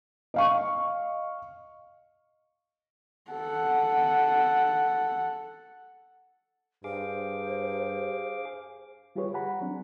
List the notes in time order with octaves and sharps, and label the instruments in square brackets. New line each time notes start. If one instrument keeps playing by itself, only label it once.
[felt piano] D#5 F5 C#6
[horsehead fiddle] A4 F#5
[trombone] G2 [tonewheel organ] G#4 F5 D6 [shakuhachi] C5
[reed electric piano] G3 F4 G4 G#4 B4 C#5
F#5 G#5 A#5 B5
F#3 C4 D4